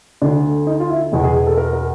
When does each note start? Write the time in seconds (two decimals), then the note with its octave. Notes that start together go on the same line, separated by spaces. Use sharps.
0.21 D2 D3 D4
0.67 D#4
0.80 F4
0.89 E4
1.12 E2 B2 G#4
1.24 G#4
1.35 G#4
1.47 A4
1.57 A#4
1.73 A#4